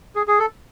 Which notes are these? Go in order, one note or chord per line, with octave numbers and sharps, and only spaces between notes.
G#4
G#4
A4